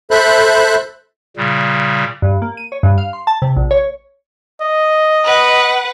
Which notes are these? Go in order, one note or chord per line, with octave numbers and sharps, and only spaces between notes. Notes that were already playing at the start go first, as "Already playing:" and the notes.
A4 C5 E5 B5 F#6
A#2 C#3 G3
G2
A#3
D#7
C#5
G2
F5
C6
A5
C3
A#1
C#5
D#5
B4 F#5